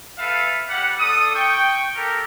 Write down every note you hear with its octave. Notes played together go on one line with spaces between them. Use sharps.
A4 B4 E5 F5
G3 F#5
D4 A4 D#6
G5 C#6
G4 A4 A#4